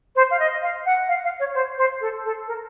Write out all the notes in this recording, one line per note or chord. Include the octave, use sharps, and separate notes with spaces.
C5
F5
D#5
F5
F#5
F5
F5
C#5
C5
C5
A4
A4
A#4